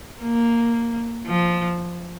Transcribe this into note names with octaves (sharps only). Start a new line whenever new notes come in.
A#3
F3